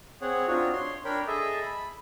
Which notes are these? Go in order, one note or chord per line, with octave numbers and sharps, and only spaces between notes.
C4 G#4 C#5 F#5
C4 D4 D#4 F4 F#4 C#5
C#5 C6
D4 A#4 C#5 G5 B5
G#4 A4 D#5 E5
B5